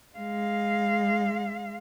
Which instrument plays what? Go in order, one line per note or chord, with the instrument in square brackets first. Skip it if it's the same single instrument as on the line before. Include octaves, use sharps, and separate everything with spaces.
[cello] G#3 F5